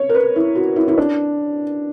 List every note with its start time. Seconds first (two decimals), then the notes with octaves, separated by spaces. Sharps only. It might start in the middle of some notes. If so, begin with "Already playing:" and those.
Already playing: C#5
0.09 A#4
0.15 B4
0.36 E4
0.55 F#4
0.76 E4
0.88 E4
0.98 D4